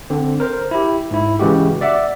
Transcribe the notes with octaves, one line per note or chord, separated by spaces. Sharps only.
D3 C4
A#4 C5
E4 G4
G#2 E4
C#3 E3 G#3 F#4 G4
D5 E5 F#5 D6